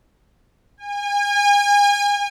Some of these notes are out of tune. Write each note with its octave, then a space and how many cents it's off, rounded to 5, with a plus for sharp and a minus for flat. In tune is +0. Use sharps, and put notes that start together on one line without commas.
G#5 -35